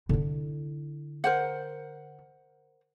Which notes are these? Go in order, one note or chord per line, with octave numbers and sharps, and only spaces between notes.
D3 E4
A#4 C5 F#5